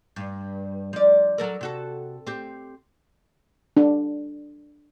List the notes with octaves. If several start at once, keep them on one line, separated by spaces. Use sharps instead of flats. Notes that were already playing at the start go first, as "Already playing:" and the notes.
G2
F3 D5
F#3 A4 A#4
C3 F#4 A4
C4 G4
D4